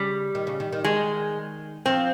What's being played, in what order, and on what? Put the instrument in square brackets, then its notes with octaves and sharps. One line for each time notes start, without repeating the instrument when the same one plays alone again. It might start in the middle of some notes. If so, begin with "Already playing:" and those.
Already playing: [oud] C#3 [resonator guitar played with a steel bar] G3
[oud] D#3
C#3
D#3
D#3
[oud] D#3 [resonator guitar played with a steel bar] G#3
[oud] F3 [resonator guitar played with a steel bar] C4